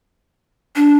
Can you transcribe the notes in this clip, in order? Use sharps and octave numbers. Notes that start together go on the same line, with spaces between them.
D4